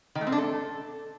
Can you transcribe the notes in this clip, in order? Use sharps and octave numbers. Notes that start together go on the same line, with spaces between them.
D#3
A3
C4
D4
A4